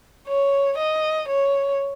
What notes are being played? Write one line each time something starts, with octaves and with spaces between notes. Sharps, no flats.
C#5
D#5
C#5